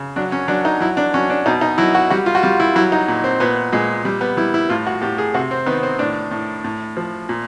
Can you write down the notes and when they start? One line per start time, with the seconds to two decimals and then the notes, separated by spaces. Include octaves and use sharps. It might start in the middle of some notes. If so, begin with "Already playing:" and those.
Already playing: C#3
0.16 F#3 D4
0.32 C#4
0.48 F#3 D4
0.65 D#4
0.80 F#3 E4
0.97 D4
1.14 F#3 C#4
1.30 D4
1.46 B2 D#4
1.61 D#4
1.78 F#3 E4
1.95 F#4
2.10 G3 F#4
2.26 F4
2.35 F#4
2.43 G3 F4
2.60 E4
2.76 F#3 E4
2.92 D#4
3.08 A#2
3.24 C4
3.40 A#2 B3
3.72 A#2 G#3
4.05 G3
4.21 B3
4.37 G3 E4
4.54 E4
4.69 A2 F4
4.87 F#4
5.02 A2 G4
5.18 G#4
5.34 C3 F#4
5.51 C4
5.66 D#3 B3
5.83 C4
5.99 A2 D4
6.31 A2
6.64 A2
6.97 F3
7.29 A#2